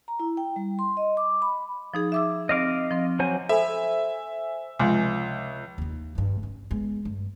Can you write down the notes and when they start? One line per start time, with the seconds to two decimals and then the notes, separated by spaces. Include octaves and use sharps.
0.08 A#5
0.19 E4
0.37 G5
0.56 G3
0.79 C6
0.97 D#5
1.17 D6
1.42 B5
1.94 F3 D#4 G#4
2.12 E5 D6 E6
2.49 C4 D#5 F5 D6
2.91 F3 C4
3.19 F#3 C5 G#5
3.49 A4 C5 E5 G#5 B5
4.79 C#2 C3 F3 C#5 G#5 C6
5.78 D#2 D#4
6.15 G2 F3
6.43 C#4
6.71 G#3 B3
7.05 G2